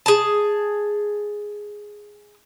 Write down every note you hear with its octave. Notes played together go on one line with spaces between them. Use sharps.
G#4 A5